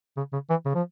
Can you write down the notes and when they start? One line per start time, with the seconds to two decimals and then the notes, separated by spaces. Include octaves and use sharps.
0.17 C#3
0.33 C#3
0.50 E3
0.65 C#3
0.75 F3